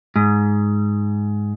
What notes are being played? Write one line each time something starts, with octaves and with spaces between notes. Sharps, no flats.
G#2